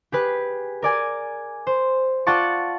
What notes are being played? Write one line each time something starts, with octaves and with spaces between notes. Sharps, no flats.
G4 G#4 B4
A#4 D5 G#5
C5
F4 D5 F#5 A5 C#6